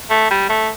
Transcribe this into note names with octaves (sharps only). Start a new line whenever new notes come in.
A3
G3
A3